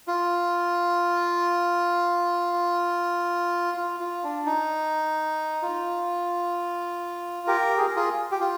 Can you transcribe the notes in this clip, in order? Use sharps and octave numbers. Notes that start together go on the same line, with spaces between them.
F4
F4
F4
D4
D#4
F4
G4 A#4
G#4
A#4
F4 G#4
G4
F4